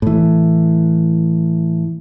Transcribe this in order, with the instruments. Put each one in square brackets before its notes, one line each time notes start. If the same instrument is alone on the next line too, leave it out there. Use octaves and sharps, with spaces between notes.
[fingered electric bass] A2 E3